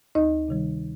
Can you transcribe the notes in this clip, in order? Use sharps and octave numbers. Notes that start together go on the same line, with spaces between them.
D2 D#4 D#5
C3 D#3 G3